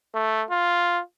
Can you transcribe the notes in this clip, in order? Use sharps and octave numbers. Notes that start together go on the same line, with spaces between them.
A3
F4